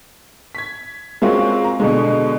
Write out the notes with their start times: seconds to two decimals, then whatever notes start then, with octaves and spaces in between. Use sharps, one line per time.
0.55 G#6 B6
1.22 G#3 A#3 C4 C#4 F4 F#4
1.64 A#5
1.80 B2 D3 G#3